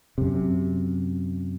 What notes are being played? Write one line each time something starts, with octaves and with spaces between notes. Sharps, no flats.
F#2 C3